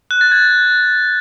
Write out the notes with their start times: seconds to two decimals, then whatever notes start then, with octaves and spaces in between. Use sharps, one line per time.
0.11 F#6
0.21 A6
0.32 G#6